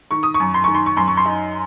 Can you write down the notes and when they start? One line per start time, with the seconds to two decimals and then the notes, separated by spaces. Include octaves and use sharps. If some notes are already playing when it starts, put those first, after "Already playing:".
0.11 D#3 C#6
0.23 D#6
0.34 C#6
0.40 F#2
0.54 C6
0.64 D#3 C#6
0.75 C6
0.86 C#6
0.96 F#2 C6
1.08 C#6
1.17 C6
1.25 D#4